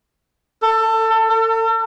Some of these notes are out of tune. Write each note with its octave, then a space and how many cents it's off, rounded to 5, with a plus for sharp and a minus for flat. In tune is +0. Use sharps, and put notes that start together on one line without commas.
A4 +25
A4 +40